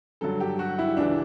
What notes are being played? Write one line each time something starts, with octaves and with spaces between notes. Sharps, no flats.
G2 D3 F#3 A4
G4
F#4
E4
C#2 C#3 E3 D4